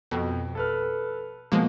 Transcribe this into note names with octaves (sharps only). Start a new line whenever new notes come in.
F2 B2
A4 B4 F6
B2 F3 G#3 A#3